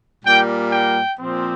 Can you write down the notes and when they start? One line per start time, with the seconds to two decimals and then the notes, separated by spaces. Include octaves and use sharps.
0.25 A#2 G3 A#3 G5
0.72 G5
1.19 A#2 F3 C4